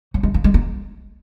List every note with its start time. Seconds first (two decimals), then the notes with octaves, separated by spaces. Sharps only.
0.14 F#3
0.23 G#3
0.34 A#3
0.44 G#3
0.54 A#3